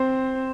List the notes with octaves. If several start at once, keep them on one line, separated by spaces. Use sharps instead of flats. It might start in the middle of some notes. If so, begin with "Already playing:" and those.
Already playing: C4 C5